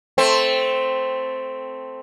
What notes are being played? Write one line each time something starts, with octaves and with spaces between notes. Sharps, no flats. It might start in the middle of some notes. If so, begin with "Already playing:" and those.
A3 C4